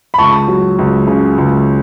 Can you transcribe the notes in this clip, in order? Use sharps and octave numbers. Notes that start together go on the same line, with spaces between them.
B5
C#2 A5 C#6
F#3
C#2
C#3
C#2